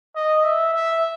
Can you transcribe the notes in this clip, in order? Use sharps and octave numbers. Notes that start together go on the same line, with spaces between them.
D#5
E5
E5